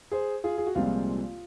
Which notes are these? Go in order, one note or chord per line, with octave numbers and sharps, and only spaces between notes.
G#4 C5
F4 G#4
G#4
F#4
C2 A#2 F3 G#3 C4 F4